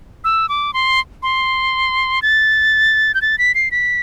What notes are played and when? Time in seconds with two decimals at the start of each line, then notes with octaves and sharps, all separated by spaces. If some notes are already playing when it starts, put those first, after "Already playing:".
0.24 E6
0.49 D6
0.74 C6
1.23 C6
2.22 A6
3.15 G6
3.22 A6
3.38 B6
3.55 C7
3.71 B6